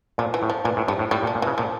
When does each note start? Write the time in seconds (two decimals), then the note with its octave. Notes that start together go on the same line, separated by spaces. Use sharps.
0.18 A#2 F3
0.34 E3
0.42 A2
0.50 F3
0.65 A#2 E3
0.77 A2
0.88 G2 F3
0.99 A2
1.11 A2 G3
1.23 A#2
1.27 F3
1.35 A#2
1.42 C#3 E3
1.58 A#2 F3